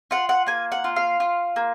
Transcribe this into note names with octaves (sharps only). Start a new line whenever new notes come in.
F4 F#5
F#5
A#3 G#5
F#5
F4
F5
F4
A#3